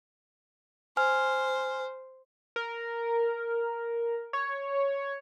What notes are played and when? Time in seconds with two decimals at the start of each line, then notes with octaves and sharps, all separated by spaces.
0.97 C5 G#5 F6
2.56 A#4
4.33 C#5